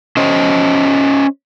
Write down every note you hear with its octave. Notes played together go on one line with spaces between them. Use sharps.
C#4 C5 D#5